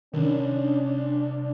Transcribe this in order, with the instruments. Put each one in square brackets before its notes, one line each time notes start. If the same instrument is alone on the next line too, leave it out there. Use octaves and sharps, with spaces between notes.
[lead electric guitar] C2 [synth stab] D#3 [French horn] C#4 [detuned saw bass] D4